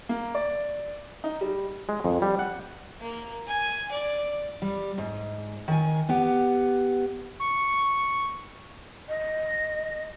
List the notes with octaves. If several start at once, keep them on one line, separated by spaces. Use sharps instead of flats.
A#3
D5
D#4
G3
G#3
F2
G3
F#5
A#3
G#5
D5
G3
G#2
D#3 G#5
B3 G4 F#5
C#6
D#5